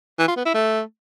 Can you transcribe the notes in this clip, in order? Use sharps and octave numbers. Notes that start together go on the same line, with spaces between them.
E3
F4
B3
E4
A3